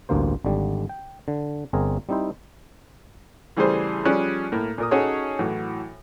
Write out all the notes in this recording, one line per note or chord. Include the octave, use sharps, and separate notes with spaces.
A1 D2 G2 A#3 C5
G#1 D3 G3
G5
D3
G1 C4 G#4 A#4
G3 C4 D#4 E4 C5
C#3 E3 G3 A3 G#4 C5
F3 G3 C#4 G#4 D5 F#6
A2 A#3
A#2 A#4 D#6
C#4 D#4 F#4 G#4 A4 C#5
A2 E3 F#3